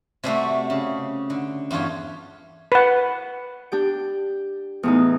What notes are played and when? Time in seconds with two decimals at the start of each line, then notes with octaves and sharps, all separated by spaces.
0.24 C3 G3 A3 F#4
0.70 C#3
1.30 D3
1.71 E2 G2 F4 G4 C#5
2.72 B4 F#5
3.72 D4 G4 G5
4.83 E2 A2 D#4